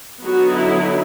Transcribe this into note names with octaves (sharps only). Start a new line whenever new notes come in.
D3 F#3 B3 D#4 F#4
E4